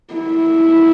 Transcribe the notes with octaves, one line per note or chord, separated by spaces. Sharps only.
E4